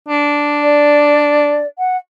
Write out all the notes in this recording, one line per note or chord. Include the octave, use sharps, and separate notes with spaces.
D4
D5
F#5